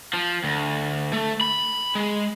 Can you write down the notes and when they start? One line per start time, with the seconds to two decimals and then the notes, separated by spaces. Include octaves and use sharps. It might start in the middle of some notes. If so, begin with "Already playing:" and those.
0.13 F3
0.44 D2
1.13 A3
1.41 B5
1.95 G#3